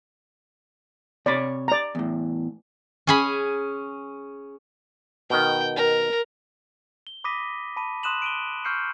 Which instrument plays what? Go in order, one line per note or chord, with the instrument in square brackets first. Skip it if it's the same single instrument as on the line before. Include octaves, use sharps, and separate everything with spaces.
[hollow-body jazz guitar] C3 C#5 B5 [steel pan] D5
[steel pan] D5 A#5
[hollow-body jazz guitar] E2 A2
[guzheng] C#4 G#4 B5
[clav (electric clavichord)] B2 D#3 [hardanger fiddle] G5
[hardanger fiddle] A#4
[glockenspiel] G7
B5 D6 D#6 A#6 B6 D#7
A5 B5 D#7
C6 D#6 F#6 D#7 E7 F#7
D7 D#7 G7
C#6 F6 G6 C7 C#7